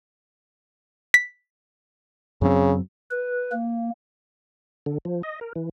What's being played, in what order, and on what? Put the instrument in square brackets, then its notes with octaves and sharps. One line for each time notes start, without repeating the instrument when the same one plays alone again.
[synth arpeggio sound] B6
[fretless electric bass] F#2 F#3 C4 [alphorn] C#3
[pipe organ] B4
A#3
[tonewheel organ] D3
F3
D#5
A#4
E3